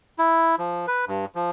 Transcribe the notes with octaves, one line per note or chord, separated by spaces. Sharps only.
E4
F3
B4
G2
F3